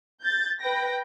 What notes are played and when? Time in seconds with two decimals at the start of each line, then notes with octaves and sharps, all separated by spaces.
0.21 G6 A6
0.59 B4 G5 A#6